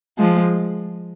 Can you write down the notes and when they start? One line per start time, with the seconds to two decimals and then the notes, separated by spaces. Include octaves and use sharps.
0.18 F3 G#3